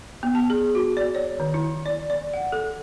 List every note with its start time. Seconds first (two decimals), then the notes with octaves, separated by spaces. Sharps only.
0.23 B3
0.35 A5
0.50 G#4
0.75 F#4
0.97 D5
1.15 C#5
1.40 D#3
1.54 E4
1.86 D5
2.10 D5
2.34 F#5
2.52 A4